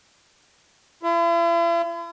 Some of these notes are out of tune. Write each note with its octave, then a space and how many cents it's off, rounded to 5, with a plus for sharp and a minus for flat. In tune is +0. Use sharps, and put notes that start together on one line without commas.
E4 +45